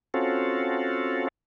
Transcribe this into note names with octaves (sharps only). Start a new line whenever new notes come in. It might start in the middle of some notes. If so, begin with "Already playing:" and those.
C4 C#4 F4 F#4 A4